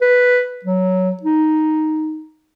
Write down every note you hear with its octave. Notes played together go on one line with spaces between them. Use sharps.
B4
F#3
D#4